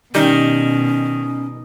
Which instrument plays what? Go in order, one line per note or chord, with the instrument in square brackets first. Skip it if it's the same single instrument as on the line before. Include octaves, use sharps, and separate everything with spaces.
[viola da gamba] B2 [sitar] D#3 [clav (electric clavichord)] G3 D#4 [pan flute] C#4